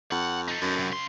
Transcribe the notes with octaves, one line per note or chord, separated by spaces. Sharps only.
F2 F#5
D#4 A4
F#2
C3 F#3
C#3 C6